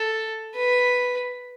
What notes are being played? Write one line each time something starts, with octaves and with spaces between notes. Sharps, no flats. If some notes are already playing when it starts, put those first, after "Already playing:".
Already playing: A4
B4